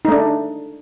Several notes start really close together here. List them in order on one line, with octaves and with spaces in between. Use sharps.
D#4 A3 D4